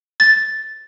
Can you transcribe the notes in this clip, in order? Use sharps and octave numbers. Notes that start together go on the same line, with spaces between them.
A6